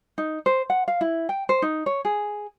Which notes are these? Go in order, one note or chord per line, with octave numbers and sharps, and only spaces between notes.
D#4
C5
F#5
F5
E4
G5
C5
D#4
C#5
G#4